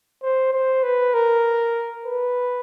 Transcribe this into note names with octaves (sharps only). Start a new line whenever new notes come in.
C5
C5
B4
A#4
B4